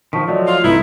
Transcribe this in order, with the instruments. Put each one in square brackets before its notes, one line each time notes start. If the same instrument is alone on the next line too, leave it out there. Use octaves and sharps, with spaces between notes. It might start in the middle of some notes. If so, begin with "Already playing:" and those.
[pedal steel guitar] D#3 F3 [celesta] A5 C#6 B6
[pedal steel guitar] F3 F#3 A3 [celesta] D5 D#5
[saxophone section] F4
[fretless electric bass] C2 A3 [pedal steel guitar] D#4 [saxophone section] E4 [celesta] B4